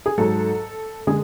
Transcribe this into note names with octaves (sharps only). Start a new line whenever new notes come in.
G#4
G#2 F#3 A4
D3 G#3 G#4